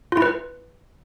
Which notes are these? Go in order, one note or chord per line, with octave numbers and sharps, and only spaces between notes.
E4 F4 B4